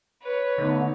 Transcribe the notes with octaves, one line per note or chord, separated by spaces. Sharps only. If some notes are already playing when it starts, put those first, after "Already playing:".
B4 C#5
D3 A3 B3 D#4